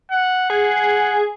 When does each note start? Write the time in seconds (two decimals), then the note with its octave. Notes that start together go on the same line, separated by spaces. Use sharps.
0.11 F#5
0.50 G#4 F#5